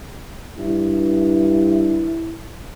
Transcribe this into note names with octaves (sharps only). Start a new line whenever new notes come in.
G2 E4